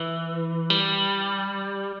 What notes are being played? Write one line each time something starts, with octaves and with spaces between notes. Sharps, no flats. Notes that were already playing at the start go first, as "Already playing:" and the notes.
Already playing: E3
G3